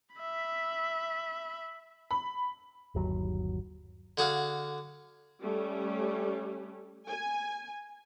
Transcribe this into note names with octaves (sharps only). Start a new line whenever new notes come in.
E5 B5
B5
G1 D#2 F#3
D3 F#4 G#4 F5
G3 A3 C#4
G#5